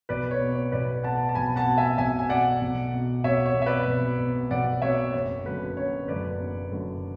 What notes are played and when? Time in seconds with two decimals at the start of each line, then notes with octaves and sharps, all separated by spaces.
0.09 B1 B4 D5
0.31 C#5
0.41 B2
0.52 C#5
0.72 B1 B4 D5
1.03 B2 F#5 A5
1.29 A5
1.35 B1 G#5 B5
1.56 F#5 A5
1.66 B2
1.78 E5 G#5
1.98 B1 E5 G#5
2.19 G#5
2.29 B2 D5 F#5
2.61 B1
2.93 B2
3.24 B1 C#5 E5
3.46 C#5
3.56 B2
3.62 E5
3.66 B4 D5
3.88 B1
4.20 B2
4.51 B1 D5 F#5
4.82 B2 C#5 E5
5.14 F#1 C#5
5.45 F#2 D3 B4
5.76 F#1 C#5
6.08 F#2 D3 B4 D5
6.40 F#1
6.72 F#2 D3